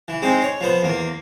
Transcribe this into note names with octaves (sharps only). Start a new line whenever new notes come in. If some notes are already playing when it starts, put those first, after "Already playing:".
E3
G#3 C4 D#4
C#5
F3 B3 C5
E2 A#3